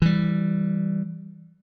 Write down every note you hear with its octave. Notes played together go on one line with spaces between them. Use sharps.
E3 G3